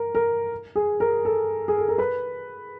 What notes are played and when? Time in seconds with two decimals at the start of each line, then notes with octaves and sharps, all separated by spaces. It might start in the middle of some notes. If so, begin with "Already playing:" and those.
Already playing: A#4
0.15 A#4
0.75 G#4
1.00 A#4
1.25 A4
1.68 G#4
1.78 A4
1.88 A#4
1.98 B4